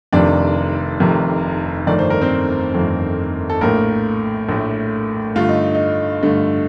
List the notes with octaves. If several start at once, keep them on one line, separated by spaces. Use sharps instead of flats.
F1 F2 C3 D#3 D4 D5
F1 F2 C3 D#3
G1 F2 D#3 A3 D5
C5
A#4
C4 C5
G1 F2 D#3 A3
A4
A#1 A2 A3 A#3 A#4
A#1 A2 A3
G2 D3 A3 F4
D#4
D#4
G2 D3 A3